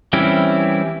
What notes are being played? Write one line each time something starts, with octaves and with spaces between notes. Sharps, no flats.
E3 G3 C4 C#4 E4